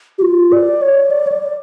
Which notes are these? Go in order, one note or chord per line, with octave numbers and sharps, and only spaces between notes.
G4
F4
D5
C#5
D5
C#5
D5